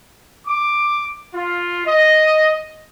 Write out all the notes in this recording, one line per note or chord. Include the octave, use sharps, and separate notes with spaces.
D6
F4
D#5